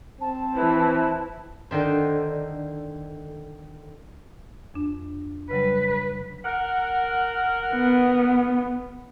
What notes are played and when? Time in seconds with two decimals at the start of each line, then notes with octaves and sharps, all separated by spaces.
0.21 C4 A5
0.56 E3 E4 B4
1.71 D3 D#3 C5
4.74 F2 D4
5.51 C#3 F#3 G3 B4
6.44 A#4 F#5
7.74 B3